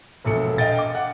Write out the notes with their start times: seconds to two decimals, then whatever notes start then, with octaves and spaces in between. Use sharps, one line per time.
0.25 E1 A#1 A4 C#7
0.58 D#5 F5 G5 A6
0.79 D6
0.95 F#5